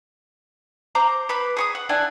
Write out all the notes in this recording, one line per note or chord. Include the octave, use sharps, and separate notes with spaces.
C5 A#5 D6
B4 B5 D6
G#4 C#6 D#6
F#5
D4 E4 F#5 G#5